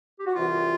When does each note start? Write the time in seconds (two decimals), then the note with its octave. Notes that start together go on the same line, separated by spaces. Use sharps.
0.17 G4
0.26 F#4
0.34 C2 C3 E3 F4